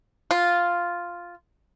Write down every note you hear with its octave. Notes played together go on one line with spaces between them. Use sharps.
F4